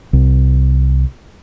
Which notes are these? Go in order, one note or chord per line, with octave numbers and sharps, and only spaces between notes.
C2